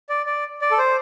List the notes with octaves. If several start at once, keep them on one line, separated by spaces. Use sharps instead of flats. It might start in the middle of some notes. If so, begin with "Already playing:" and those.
D5
D5
D5
A4
C5